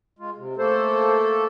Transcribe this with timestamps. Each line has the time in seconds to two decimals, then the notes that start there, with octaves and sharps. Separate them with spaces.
0.19 G#3 F4
0.37 C3
0.57 A3 A#3 A4 C5